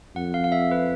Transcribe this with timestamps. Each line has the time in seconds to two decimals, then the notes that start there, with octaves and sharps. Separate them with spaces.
0.16 F2 F#5
0.34 F5
0.44 F5
0.52 E5
0.71 B4